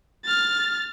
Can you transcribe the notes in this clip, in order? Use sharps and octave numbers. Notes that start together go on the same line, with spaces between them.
F6 A6